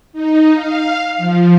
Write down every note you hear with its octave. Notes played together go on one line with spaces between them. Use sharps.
D#4
F5
F3